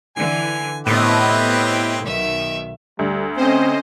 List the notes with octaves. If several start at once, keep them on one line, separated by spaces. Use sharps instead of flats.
D3 E3 G#5
A2 B3 C4 E4 G4 B4 D#5
B1 D#3 E5
D2 G3
C4 C#4 C5 D#5